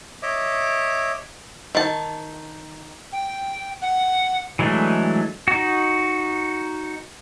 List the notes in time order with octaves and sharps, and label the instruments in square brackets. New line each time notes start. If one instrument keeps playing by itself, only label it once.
[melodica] C#5 D#5 E5 D6
[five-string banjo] D#3 A5
[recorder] G5
F#5
[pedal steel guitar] E3 F#3 G#3 A3 D4
D#4 F#4